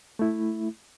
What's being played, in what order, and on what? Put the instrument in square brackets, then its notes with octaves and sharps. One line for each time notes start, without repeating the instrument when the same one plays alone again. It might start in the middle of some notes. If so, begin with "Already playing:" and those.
[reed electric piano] A3 E4